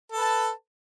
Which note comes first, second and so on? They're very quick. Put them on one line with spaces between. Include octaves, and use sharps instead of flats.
A4 B4 A5